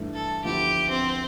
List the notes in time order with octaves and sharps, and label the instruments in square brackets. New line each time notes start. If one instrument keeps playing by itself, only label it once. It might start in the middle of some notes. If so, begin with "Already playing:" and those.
Already playing: [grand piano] G2 E3 A3
[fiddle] A4
[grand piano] D2 D3 F3 B3 E4 [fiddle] G4
[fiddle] C4